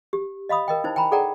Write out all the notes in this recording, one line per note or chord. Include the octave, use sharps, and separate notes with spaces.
G4
D#5 F5 B5 D#6
A#4 D#5 G5
D#4 E4 C5
G5 G#5 A#5 B5
G#4 A4 D5 F#5 G5 A#5